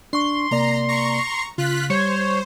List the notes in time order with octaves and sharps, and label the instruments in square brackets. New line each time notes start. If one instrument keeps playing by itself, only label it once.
[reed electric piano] D4 C#6 [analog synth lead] C6
[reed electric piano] C3 A#3 D5 [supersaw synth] A#5
[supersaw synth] A#5 C#6
[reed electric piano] C#3 [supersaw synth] F4 F#6 B6
[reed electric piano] G3 [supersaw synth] C5 [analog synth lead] C#5